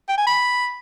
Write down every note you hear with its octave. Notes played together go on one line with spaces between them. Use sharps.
G5
G#5
B5